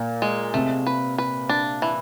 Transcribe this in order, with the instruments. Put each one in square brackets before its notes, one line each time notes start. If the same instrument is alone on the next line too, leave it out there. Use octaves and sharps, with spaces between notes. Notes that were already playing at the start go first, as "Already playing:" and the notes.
Already playing: [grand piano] A#2
[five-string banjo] G#3
[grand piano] C3 [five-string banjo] A3
[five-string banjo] B4
B4
D4
E3